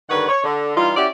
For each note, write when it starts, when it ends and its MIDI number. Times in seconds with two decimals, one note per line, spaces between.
0.10 0.28 43
0.10 0.28 50
0.10 0.28 51
0.10 0.28 71
0.10 0.28 73
0.10 0.28 78
0.28 0.41 73
0.44 0.74 50
0.76 0.93 52
0.76 0.93 55
0.76 0.93 63
0.76 0.93 65
0.97 1.06 61
0.97 1.06 64
0.97 1.06 66
0.97 1.06 67
0.97 1.06 74